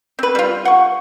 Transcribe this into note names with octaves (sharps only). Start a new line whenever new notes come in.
C4 B4
G3 F4
F#5 C#6